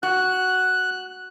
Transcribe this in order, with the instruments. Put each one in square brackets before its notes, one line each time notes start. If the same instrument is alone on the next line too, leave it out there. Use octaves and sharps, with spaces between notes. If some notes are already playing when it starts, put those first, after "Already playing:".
[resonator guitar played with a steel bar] F#4 [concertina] F#6